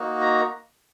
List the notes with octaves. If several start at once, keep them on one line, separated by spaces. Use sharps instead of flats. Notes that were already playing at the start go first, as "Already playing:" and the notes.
Already playing: A#3 D#4 F#4
A#5